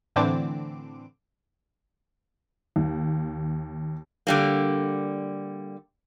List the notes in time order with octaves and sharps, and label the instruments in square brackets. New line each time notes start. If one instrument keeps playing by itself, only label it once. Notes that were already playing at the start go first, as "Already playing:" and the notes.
[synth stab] A2 D3 E3 C4 D4 D6
[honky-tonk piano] D#2
[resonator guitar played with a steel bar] D3 G3 A#3